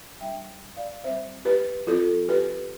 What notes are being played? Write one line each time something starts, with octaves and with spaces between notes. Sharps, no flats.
G3 D4 E5 G5
D5 F5
G3 C4 C5 E5
G4 B4
F3 C4 F4 A4
G4 B4